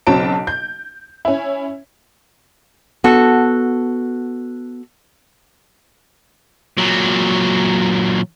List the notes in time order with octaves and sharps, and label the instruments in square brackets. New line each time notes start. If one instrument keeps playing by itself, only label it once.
[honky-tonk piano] B1 C#3 F#3 C4 A5 D7
G6
C#4 E4
[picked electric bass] B3 [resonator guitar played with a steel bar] F#4 A4
[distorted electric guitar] A#2 F#3